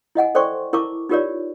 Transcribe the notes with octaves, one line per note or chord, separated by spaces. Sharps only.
E4 D#5 F#5 G#5
A4 C5 D5 G5 C6 C#6
E4 A#4 A5 C#6 D6
D#4 F4 G4 A#4 C#5 D5